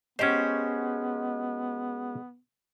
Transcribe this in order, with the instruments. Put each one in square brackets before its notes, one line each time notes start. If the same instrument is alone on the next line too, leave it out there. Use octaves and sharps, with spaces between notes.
[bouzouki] G#3 F#4 [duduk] B3 [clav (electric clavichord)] C#4 G4 C5